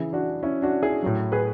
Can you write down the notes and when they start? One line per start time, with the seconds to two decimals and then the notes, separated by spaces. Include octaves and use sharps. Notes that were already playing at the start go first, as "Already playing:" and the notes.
Already playing: C#3 E3 E4 G#4
0.13 D4 F#4
0.43 C#4 E4
0.62 D4 F#4
0.83 E4 G#4
1.03 A2 F#3
1.32 G#4 B4